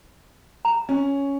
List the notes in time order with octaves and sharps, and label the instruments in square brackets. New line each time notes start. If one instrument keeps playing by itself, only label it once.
[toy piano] A#5
[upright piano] C#4